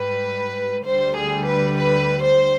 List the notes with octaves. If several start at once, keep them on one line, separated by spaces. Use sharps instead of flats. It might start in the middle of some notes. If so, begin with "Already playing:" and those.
Already playing: G#2 G3 B4
D2 D3 G3 C5
G#4
B4
B4
C5